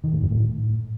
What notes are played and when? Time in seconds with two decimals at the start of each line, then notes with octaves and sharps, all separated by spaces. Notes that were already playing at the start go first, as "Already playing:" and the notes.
0.04 D#3
0.13 A2
0.22 F#2
0.30 A2